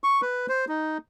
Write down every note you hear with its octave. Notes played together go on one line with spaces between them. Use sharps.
C#6
B4
C5
D#4